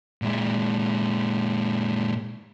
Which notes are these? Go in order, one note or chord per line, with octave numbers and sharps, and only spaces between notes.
A#2 G#3